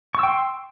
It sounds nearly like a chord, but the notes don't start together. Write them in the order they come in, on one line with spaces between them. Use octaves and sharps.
C#6 E6 G5 C6